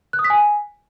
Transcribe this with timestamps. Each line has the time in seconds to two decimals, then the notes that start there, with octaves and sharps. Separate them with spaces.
0.13 F#6
0.19 D#6
0.24 B6
0.30 G#5